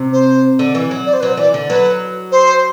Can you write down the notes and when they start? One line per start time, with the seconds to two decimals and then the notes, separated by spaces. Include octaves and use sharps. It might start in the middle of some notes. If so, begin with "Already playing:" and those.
Already playing: C3
0.12 C5
0.59 D3
0.75 E3
0.91 F#3
1.06 D5
1.13 C5
1.20 F#3 B4
1.28 C5
1.37 E3 D5
1.54 D3
1.69 F#3 B4
2.32 C5